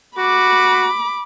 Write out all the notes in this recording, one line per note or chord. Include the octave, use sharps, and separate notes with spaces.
F#4 B5 D6